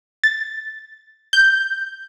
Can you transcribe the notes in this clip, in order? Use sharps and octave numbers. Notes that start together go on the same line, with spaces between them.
A6
G6